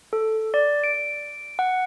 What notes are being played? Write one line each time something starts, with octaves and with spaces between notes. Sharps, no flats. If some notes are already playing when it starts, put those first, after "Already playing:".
A4
D5
D7
F#5